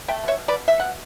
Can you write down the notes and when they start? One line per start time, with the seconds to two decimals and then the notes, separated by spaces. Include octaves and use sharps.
0.08 A3 E5 G5
0.24 B2 C#5 E5
0.38 B2
0.48 B4 D5
0.53 B2
0.68 B2 E5
0.80 B2 F#5